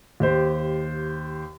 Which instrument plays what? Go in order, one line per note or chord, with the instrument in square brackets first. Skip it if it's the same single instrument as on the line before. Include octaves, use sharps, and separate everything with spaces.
[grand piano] D#2 G4 C5